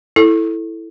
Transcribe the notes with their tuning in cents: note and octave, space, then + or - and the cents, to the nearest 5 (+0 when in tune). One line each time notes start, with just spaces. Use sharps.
E4 +0 A4 +0